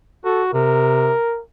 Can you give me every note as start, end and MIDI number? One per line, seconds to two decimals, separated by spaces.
0.25 0.50 66
0.25 0.43 69
0.53 1.13 48
0.53 1.41 70